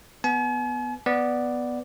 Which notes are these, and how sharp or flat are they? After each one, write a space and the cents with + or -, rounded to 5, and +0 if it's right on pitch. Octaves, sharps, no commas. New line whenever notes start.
B3 +0 G#5 +45
B3 +0 D5 +0